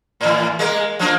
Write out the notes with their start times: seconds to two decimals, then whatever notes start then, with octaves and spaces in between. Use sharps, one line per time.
0.21 A2 E3
0.59 G#3 A#3 A#4
0.99 F3 A#3 D4